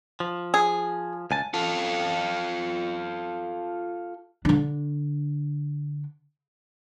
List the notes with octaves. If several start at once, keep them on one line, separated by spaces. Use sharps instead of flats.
F3
G#4
C#2 G#5 A5
F4 A4
D3 D4